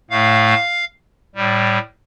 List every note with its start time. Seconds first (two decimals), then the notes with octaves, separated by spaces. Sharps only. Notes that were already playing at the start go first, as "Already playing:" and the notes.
0.10 A2 A3 F5
1.35 A2 G3